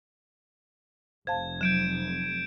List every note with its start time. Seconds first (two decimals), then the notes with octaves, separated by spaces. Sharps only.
1.27 F1 C5 F5 A5 G#6
1.61 F#3 G6 D7 E7